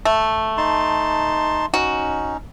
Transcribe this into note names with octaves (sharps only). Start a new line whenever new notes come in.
A3
D#4 A5 C6
C#4 D#4 F#4